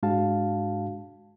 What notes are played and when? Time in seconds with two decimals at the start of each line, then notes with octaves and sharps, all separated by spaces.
0.03 G#2 G#3 D4 F#4 F5 A5